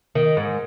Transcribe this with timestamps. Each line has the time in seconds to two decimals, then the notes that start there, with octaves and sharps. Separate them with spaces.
0.15 D#3
0.37 G#2